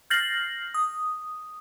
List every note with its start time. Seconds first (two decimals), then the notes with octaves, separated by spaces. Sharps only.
0.10 F6 G6 A6 A#6 C7 F#7
0.74 D#6